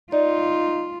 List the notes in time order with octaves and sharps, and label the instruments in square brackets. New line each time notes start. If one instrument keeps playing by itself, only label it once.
[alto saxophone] D#4 [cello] F4 [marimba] D5